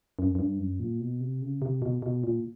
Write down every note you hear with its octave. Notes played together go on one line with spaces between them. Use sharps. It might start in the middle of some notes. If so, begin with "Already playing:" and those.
F#2
F#2
G2
F#2
A#2
B2
C3
C#3
C3
B2
B2
A#2